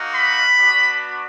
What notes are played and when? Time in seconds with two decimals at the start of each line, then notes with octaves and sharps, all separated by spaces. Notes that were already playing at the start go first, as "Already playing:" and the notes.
Already playing: A#3 D#4 F#4
0.15 B5
0.57 B3 D4 F#4